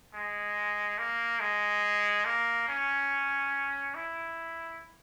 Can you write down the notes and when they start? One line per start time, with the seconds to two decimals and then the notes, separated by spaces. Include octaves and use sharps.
0.14 G#3
0.98 A#3
1.40 G#3
2.25 A#3
2.68 C#4
3.95 E4